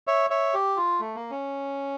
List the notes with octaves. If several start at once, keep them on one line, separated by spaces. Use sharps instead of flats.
C#5 E5
C#5 E5
G4
F4
A3
A#3
C#4